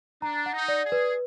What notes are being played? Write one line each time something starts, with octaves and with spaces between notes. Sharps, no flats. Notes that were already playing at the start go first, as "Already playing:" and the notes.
D4 A#5
F#5
D#4
D5
G#4
B4